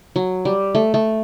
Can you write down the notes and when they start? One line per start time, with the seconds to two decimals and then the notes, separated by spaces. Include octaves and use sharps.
0.16 F#3
0.45 G3
0.75 A3
0.94 A3